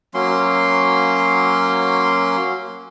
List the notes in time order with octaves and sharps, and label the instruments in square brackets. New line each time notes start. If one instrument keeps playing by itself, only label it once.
[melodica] F#3 A#3 C#4 C6